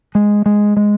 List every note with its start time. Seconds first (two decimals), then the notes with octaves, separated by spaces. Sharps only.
0.15 G#3
0.46 G#3
0.77 G#3